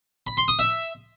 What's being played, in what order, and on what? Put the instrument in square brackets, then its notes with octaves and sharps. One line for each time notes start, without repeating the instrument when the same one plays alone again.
[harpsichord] B5
C6
D#6
E5